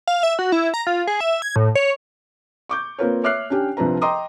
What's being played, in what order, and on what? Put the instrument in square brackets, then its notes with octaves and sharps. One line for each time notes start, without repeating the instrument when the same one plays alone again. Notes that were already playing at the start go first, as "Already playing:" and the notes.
[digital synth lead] F5
E5
F#4
E4
A#5
F4
G#4
E5
G#6
A2
C#5
[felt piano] C#6 D6 G6
A#3 C4 F4 A#4 B4 C#5
C#5 E5 D6 F6 F#6 C7
C#4 D4 G4 G5
C2 F3 C4 D4 B4 A#5
D#5 G5 A#5 C6 D6 D#6